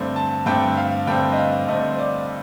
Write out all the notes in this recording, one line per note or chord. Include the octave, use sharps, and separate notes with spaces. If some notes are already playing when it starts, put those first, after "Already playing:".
Already playing: G2 D3 A3 C4
A5
G2 D3 A3 C4 G5
F5
G2 D3 A3 C4 G5
D#5
F5
G2 D3 A3 C4 D#5
C5
D5